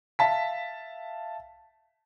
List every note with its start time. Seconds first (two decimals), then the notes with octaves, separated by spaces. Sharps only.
0.19 E5 F5 A5 B6